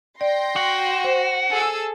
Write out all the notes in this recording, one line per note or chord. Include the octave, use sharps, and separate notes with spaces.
D5 G5 C6 A#6
F#4
C5
G#4 A4 E6